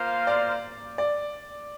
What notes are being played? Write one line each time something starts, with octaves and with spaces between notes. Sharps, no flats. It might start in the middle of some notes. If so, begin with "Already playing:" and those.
Already playing: A#3 F4 C5 F5
D5
D5